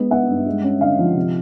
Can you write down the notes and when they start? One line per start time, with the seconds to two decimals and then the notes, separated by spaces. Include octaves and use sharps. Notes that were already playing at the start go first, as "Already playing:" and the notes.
Already playing: G#3 B3
0.11 B3 E5 F#5
0.28 G2
0.46 G#3
0.64 C#4
0.81 D3 D#5 F5
0.99 F3
1.15 C3